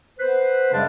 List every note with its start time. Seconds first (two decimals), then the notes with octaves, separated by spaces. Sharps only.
0.19 B3 B4 C5
0.73 F#2 C#3 G3 G#3 D4